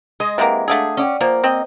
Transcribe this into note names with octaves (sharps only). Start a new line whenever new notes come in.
G#3 D#5
C3 E3 A#3 D#5 F#5 A#5
A3 D4 G#4 F5 F#5 E6
C#4 D5 F#5 G5
F3 A#3 C5
C4 D#5